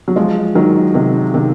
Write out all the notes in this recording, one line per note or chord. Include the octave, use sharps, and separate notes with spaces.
F#3
F3 G#3
D#3 F#3
C3 D#3
C3 D#3